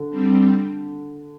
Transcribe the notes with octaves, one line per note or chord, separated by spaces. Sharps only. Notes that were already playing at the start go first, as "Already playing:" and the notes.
Already playing: D3
G3 C4